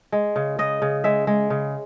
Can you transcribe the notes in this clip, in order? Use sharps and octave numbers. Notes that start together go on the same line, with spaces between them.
G#3
C#3
C#3 D#5
C#3
G#3 E5
G#3
C#3